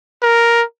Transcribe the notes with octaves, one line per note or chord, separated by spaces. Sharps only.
A#4